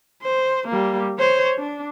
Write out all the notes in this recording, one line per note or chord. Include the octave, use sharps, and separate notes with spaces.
C5
G3 A#3
C5 C#5
D4